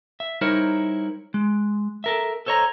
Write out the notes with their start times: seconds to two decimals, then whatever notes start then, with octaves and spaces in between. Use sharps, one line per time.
0.20 E5
0.41 G3 D#4 E4 A#4 C5 C#5
1.34 G#3
2.04 A4 A#4 E5
2.46 A4 C5 C#5 D#5 A#5